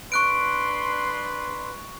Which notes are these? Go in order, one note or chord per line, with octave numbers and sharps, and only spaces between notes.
D4 B4 C6 C#6 F#6 D7